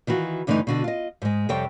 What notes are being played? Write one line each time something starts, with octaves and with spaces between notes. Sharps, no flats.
D#3 E3 F4 F#4
G2 D3 E3 A3 C4 D#4
B2 D3 F#4
F4 D#5
G#2 G#3
F2 C3 G3 A4 C#5 G5